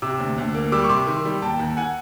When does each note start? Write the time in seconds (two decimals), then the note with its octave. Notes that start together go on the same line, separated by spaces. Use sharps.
0.02 C3 D6 E6
0.20 D2
0.38 D2
0.55 A#3
0.72 G3 D6 E6
0.84 C#6
0.89 C3 C6 D6
1.07 D#3
1.25 G3
1.42 D#2 G5 A5
1.59 D#2
1.77 F#5 G#5